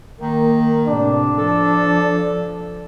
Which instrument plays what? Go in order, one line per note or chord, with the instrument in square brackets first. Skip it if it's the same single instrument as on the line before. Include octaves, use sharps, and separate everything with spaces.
[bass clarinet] D#3 [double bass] A#3
[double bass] A2 C3 [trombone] D4
[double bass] F3 [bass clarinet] A4